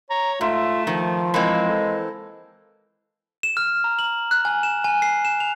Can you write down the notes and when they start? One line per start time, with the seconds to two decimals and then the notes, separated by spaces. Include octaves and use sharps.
0.10 C#5 A#5
0.41 G#2 A3 F4 E5
0.87 D#3 F3
1.34 E3 G#3 A#3 C4
1.69 A4
3.43 E7
3.57 F6
3.84 A#5
3.99 F#7
4.31 F#6
4.45 G#5
4.63 E7
4.84 G#5
5.02 C7
5.25 E7
5.40 F7